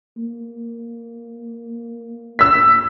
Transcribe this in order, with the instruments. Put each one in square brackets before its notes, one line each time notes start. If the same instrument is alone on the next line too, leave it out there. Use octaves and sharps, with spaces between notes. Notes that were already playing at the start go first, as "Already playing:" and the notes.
[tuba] A#3
[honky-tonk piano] E6 B6